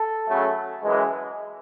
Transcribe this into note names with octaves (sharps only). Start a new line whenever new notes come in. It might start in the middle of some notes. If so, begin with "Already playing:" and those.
Already playing: A4
C#3 F#3 A3
F#2 E3 G#3